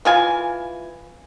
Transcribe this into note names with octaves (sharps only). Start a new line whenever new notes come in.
E3 F4 G#5